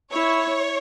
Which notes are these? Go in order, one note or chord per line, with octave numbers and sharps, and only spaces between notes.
E4 C#5